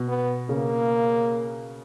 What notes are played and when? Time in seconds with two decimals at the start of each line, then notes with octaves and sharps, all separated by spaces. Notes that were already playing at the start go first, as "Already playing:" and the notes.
Already playing: B2
0.08 B3
0.49 C#3 A#3